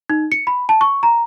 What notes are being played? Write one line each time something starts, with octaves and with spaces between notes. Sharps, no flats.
D#4
C#7
B5
A5
C#6
A#5